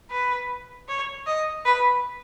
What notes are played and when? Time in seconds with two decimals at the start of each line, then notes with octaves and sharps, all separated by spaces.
0.11 B4
0.88 C#5
1.27 D#5
1.65 B4